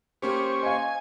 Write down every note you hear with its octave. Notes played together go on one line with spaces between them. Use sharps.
A#3 C#4 G4 C5 C#6
D#5 F5 G#5